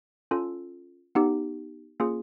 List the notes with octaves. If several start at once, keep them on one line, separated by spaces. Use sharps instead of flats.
C#4 F4 A4
B3 D#4 G4
A#3 C#4 F4 G#4